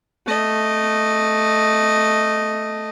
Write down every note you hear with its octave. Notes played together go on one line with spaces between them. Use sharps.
A3 D#5